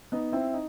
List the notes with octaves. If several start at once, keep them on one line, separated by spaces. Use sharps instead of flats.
B3 D#4
C4 E4
D#4